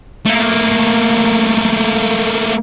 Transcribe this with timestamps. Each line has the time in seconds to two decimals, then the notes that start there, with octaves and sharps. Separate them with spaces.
0.25 A3 A#3